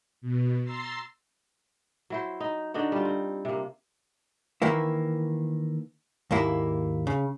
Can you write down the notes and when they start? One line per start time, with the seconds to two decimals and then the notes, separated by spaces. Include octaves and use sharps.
0.21 B2
0.64 A#5 C6 E6 A6 C7
2.10 F#3 E4 C5
2.40 D#4
2.74 D3 D4 D#4 F#4
2.92 G3 F4
3.05 C4
3.45 C3 A#3
4.62 D#3 E3 A#3 E4
6.31 D#2 G#2 A#3 E4
7.07 C#3